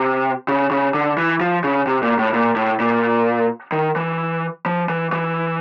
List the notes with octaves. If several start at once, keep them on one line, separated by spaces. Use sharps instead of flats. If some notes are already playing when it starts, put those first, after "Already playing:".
Already playing: C3
C#3
C#3
D3
E3
F3
C#3
C3
A#2
A2
A#2
A2
A#2
D#3
E3
F3
E3
E3